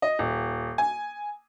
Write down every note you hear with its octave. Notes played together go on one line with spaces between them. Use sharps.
D#5
D#1
G#5